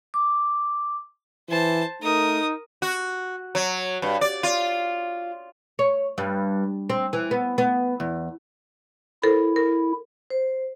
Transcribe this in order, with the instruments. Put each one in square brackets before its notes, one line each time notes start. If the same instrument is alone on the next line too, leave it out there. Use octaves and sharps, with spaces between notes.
[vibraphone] D6
[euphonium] E3 [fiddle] C5 A5
[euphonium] A3 [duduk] D#4 [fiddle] A#4 D#6
[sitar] F#4
F#3
G2
D5
F4
[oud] C#5
G2
C4
E3
B3
B3
E2
[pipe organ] E4 [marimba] A4 A#4 C5
[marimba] A#4
[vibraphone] C5